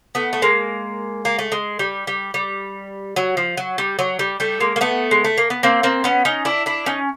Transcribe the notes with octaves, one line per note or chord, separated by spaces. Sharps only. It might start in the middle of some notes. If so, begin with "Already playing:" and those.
A3 B3
A3
G#3 A#3
A#3
A3
G#3
G3
G3
G3
F#3
F3
F#3
G3
F#3
G3
G3 A3
G#3 A#3
A#3
A3 B3
G#3
A3
A#3
B3
A#3 C4
A#3 C4
B3 C#4
C#4 D#4
D4 E4
D4 E4
C#4 D#4